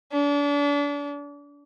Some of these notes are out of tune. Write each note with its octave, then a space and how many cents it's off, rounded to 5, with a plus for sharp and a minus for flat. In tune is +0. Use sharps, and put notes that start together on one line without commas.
D4 -35